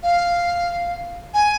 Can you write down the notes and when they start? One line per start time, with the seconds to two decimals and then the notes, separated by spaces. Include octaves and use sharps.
0.03 F5
1.34 G#5